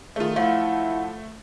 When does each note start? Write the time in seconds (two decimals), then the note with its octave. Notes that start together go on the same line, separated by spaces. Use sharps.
0.16 D#3 A3 F4 G#4
0.36 F3 A3 E4 F#5